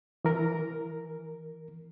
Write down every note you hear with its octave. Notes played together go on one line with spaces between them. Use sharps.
E3 A#4